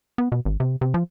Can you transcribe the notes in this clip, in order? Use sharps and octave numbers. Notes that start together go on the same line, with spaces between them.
B3
B2
G#1
C3
C3
F3